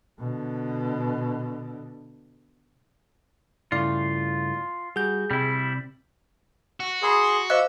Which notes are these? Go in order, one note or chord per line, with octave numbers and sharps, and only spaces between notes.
B2 D3
G2 C#3 A3 E4 F4 D5
G3 F#4 G#4 G6
C3 G3 E4
F#4
G#4 A#4 B5 C6 D#6
C5 D#5 F5 D6 E6 F#6